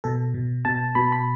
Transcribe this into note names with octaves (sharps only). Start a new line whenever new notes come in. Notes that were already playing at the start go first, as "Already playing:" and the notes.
B2 A4
B2
B2 A5
B2 B5
B5